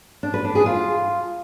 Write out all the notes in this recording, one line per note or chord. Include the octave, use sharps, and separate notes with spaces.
D4
B4
D4
G#4
F4